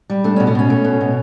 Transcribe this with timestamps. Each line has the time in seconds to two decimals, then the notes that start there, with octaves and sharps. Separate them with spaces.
0.10 G3
0.24 A3 D4
0.36 B2 C#4
0.47 B3
0.55 B2 C#4
0.70 A3
0.85 B2
1.01 B2